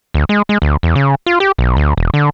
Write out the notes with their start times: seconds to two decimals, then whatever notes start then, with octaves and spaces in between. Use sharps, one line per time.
0.14 D2
0.29 G#3
0.49 G#3
0.62 D2
0.83 E2
0.96 C#3
1.26 F4
1.40 G4
1.58 B1
1.77 D2
1.97 E1
2.14 D3